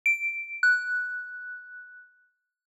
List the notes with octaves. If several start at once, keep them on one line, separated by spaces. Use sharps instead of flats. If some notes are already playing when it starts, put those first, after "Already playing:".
D7
F#6